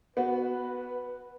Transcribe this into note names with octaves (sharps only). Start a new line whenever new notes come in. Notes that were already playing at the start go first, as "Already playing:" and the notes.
B3 F#4 B4